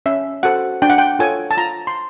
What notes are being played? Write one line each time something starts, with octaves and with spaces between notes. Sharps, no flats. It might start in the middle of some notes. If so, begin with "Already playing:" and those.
C#4 E5
F#4 A4 C5 F#5
D4 G5
F#5
G5
F4 A4 C#5 G#5
A5
F4 A#5
C6